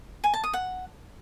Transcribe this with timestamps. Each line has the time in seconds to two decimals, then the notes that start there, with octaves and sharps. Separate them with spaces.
0.24 G#5
0.34 A5
0.44 D#6
0.53 F#5